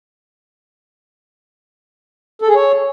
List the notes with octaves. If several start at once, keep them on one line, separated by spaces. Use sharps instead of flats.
A4
G#4
C#5